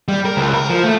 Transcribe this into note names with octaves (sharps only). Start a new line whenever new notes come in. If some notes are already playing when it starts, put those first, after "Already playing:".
G3
A#4
C#2
A#4
F3
A3